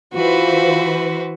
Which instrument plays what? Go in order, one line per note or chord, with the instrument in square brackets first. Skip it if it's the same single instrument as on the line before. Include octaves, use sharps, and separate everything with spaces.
[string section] E3 B4 C5 [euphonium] F4 [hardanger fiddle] F#4